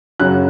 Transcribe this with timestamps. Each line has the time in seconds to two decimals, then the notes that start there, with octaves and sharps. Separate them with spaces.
0.20 F#2 C#3 F#3 F#6